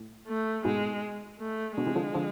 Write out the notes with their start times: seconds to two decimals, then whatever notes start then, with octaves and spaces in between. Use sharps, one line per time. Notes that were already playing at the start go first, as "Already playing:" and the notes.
Already playing: A2
0.27 A3
0.65 G#2 B2 G#3
1.39 A3
1.77 B2 D3 G#3
1.87 C3 E3
1.96 D3 F3
2.14 D3 F3